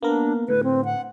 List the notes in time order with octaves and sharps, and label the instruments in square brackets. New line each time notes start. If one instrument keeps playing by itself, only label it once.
[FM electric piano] A#3 B3 A#4 [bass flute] D4
[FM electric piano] A2 D3 [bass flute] B4
[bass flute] C4
F#5